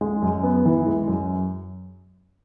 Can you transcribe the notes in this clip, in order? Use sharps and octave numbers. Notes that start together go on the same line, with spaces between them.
G#3
F#2
B3
E3
G#3
F#2